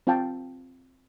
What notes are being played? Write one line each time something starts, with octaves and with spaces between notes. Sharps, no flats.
C4 F4 F5 G5 A5